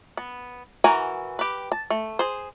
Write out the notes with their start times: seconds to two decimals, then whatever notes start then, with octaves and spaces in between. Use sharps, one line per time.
0.17 B3
0.84 E3 F#4 A#4 G#5 A#5
1.39 G4 B4
1.72 A5
1.90 A3
2.19 G#4 C5